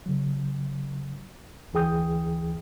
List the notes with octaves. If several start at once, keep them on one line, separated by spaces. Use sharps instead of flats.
C#3 F#3
D2 E3 G#4 G5 D#6 G6